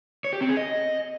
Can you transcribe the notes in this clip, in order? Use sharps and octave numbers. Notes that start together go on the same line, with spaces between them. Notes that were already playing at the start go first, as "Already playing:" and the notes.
C#5
G4
C4
G#4
D#5